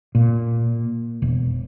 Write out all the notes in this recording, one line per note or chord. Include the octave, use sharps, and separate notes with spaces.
A#2
E1